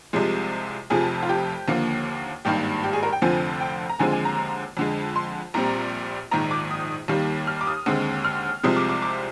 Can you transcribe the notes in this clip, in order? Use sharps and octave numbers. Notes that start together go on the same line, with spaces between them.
C2 C3 F3 G#3
F1 F2 C3 F3 G#4
F4
G4
D#2 D3 F3 A#3
G#1 G2 D#3 A#3 G4
G4
G#4
A#4
G5
F1 F2 D3 F3 C4 G#5
G5
A#5
D#2 D3 F3 G#3 C4 G#5
G#5
A#5
F2 D3 G#3
C6
A#1 A#2 G3 C4 A#5
A#1 G#2 D#3 A#5
D6
D#6
D#2 D#3 G3 A#3
F6
D6
D#6
D#2 D3 G#3 C4
F6
C2 C3 F3 G#3 C4 D#6
D6
D6
D6